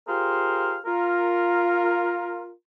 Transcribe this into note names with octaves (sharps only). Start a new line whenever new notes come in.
F4 G4 G#4 A#4 C5 F5
F4 A#4